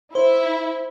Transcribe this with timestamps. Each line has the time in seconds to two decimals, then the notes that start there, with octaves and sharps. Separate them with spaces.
0.15 E4 C5